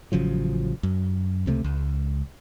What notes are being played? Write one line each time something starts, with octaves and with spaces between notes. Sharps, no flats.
A1 C#3 F3 F#3
F#2
C#2 C3 G3 A3
C#2